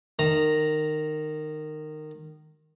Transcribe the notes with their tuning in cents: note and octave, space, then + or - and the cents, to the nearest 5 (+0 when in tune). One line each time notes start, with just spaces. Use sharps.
D#3 -20 A#5 +0